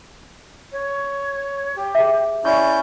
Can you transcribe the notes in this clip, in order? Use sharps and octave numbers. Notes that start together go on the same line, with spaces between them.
C#5
G4
G#4 E5
C#4 E4 D5 C#6 G6